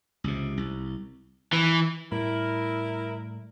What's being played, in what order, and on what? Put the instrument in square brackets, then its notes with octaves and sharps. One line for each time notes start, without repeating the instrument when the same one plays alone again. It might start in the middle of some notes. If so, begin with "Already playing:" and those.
[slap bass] C#2 C3
C2
[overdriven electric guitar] E3
[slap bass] A2 G3 [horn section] E4 A#4